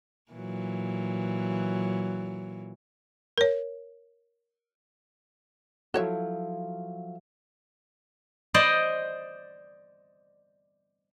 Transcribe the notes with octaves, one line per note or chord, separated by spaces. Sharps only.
A#2 E3 F#3
A#4 C#5
F3 F#3 E4 F#4 A4 C#5 E5
C5 D5 D#5